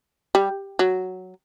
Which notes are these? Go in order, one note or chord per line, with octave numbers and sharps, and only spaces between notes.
G3
F#3